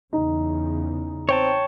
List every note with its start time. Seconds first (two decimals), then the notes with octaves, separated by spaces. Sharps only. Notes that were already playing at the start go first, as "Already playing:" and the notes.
0.13 E2 C#3 D#4
1.29 C4 C#5 G5 A5